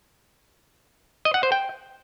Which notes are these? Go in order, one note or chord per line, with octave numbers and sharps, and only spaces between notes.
D#5
F#5
C5
G5